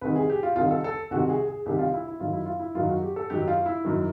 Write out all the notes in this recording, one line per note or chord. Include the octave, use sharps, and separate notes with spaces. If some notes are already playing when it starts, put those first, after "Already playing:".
C2 C3 D#3 B4
G#4
G4
F4
C2 C3 D#3 F4
A4
A4
C2 C3 D#3 F#4
G#4
G#4
C2 C3 D#3 G4
F4
E4
E4
F#2 D#3 F#3 F4
E4
F4
E4
F#2 D#3 F#3 F4
F#4
G4
A4
F#2 D#3 F#3 G4
F4
E4
F#2 D#3 F#3